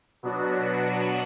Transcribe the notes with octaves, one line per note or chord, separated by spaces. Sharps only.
B2 F#3 B3 D4 F#4